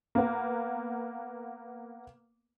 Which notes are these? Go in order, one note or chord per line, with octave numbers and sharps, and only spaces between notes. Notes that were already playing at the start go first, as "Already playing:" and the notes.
A#3 B3